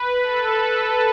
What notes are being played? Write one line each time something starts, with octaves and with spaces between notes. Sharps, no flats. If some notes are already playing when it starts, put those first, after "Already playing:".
Already playing: B4
A4